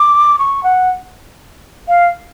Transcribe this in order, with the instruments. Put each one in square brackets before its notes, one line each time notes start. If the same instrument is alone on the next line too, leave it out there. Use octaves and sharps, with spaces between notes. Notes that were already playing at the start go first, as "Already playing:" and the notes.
Already playing: [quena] D6
C#6
F#5
F5